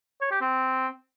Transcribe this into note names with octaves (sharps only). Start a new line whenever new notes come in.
C#5
G4
C4